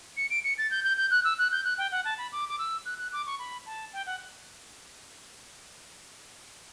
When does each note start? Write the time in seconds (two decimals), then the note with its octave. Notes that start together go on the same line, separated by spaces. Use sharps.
0.17 C#7
0.30 D7
0.44 C#7
0.58 A6
0.71 G6
0.84 G6
0.97 G6
1.11 F#6
1.24 E6
1.38 F#6
1.52 G6
1.64 F#6
1.78 G5
1.92 F#5
2.05 A5
2.18 B5
2.32 D6
2.49 D6
2.59 E6
2.86 F#6
2.98 F#6
3.13 D6
3.26 C#6
3.39 B5
3.66 A5
3.93 G5
4.06 F#5